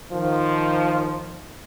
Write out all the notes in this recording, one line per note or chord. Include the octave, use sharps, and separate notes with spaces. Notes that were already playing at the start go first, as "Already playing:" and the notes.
D#3 F3